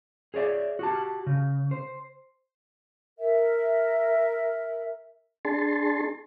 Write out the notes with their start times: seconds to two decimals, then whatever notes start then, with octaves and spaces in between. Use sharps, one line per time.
0.34 G#4 C#5 D5 E5
0.79 F#4 G4 A5
1.27 C#3
1.71 C5
3.19 A#4 E5
5.45 D4 G#4 A5 C6